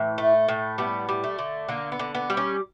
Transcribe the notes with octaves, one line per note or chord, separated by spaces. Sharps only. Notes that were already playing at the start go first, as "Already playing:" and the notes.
Already playing: A2 E3
A3
A2
G3 B3
G3
A3
D3
D3 A#3
B3
D3
B3
G3
C#4